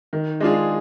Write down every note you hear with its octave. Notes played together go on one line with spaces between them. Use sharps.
D#3
G#3 D4 F4 G#4